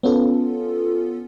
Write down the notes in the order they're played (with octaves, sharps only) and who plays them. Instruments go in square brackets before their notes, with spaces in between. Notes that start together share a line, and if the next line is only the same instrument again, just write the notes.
[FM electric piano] B3 C#4 F4 A4